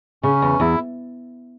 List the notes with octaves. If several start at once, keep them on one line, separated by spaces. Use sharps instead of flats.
C#3 C#4
E2
E2 E4